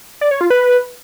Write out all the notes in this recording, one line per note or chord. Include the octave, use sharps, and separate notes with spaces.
D5
C#5
F4
B4